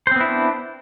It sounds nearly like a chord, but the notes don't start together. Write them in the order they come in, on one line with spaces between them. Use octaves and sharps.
C5 C4 B3 E4 D4